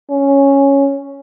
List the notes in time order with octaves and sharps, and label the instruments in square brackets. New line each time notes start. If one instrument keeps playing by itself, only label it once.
[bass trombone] C#4